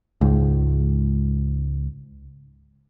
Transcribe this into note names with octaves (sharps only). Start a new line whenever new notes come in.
C#2 G#2